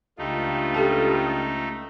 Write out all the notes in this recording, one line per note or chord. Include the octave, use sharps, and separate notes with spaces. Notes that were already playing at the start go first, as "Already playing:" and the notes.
C#2 G2 A3 D#4 F4
G4 A4 A5